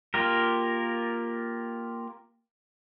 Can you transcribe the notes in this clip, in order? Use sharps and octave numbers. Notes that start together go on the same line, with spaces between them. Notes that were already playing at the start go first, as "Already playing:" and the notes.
A#3 F4 G4 A#4